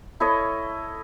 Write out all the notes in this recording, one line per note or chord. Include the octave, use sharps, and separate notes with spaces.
E4 A4 C#5 D#5